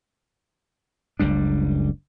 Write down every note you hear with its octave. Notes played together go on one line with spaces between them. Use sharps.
F#1 C#2 G3 D4